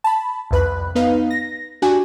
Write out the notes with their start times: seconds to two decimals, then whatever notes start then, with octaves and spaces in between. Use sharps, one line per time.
0.04 A5 B5
0.51 C2 F2 B4 B5 F#6
0.95 B3 D#4 B4 F5
1.30 A#6
1.82 D4 F#4 G4 G#5